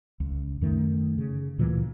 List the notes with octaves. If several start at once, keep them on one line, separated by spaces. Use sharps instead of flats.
C#2
F#2 D#3 A3
C#3
D2 A#2 E3 A#3